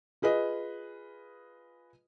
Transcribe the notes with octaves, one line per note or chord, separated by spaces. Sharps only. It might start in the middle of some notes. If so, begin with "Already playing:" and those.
F4 G#4 B4 D#5